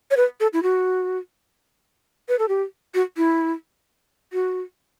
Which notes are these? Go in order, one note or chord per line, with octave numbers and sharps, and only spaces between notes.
C#5
B4
A4
E4
F#4
B4
A4
G4
F#4
E4
F#4